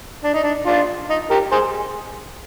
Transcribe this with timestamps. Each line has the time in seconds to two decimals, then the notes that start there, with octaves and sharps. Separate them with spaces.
0.24 D4
0.34 D#4
0.44 D4
0.66 D4 F4
1.10 D#4
1.31 G4 A#4
1.52 G#4 C5